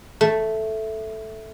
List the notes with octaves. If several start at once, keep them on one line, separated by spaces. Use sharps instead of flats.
A3